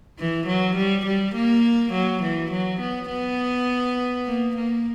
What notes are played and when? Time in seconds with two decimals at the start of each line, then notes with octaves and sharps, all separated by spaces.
0.19 E3
0.47 F#3
0.76 G3
1.06 G3
1.35 A#3
1.93 F#3
2.23 E3
2.51 F#3
2.80 B3
3.09 B3
4.26 A#3
4.56 A#3